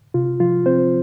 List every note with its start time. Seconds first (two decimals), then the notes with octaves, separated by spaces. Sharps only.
0.14 C3 F4
0.40 F3 F4
0.66 C4 C5